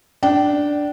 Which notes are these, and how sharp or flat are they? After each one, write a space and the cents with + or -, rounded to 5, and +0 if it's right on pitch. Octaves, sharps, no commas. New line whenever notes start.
D4 +0 G5 -35